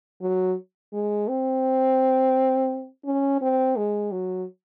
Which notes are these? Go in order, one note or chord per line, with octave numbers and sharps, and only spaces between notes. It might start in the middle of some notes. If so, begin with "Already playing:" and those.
F#3
G#3
C4
C#4
C4
G#3
F#3